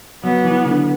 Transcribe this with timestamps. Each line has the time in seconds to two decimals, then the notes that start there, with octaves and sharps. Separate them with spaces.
0.23 F#3 B3
0.44 E3
0.65 D3